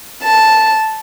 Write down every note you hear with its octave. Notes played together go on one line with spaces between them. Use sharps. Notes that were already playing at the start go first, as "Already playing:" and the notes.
A5